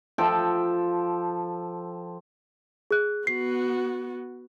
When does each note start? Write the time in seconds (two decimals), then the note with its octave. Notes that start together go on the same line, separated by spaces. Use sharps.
0.18 F3 A4 G5
2.91 G#4 F#6
3.27 B3 F#4 C7